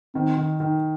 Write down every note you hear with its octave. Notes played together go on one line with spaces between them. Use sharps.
D#3 C4
D#3
D#3